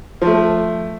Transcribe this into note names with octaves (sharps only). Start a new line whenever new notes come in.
F3 A3